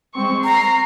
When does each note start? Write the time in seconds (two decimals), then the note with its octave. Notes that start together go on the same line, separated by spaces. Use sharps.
0.14 G#3 C4 C#6
0.44 A#5 C7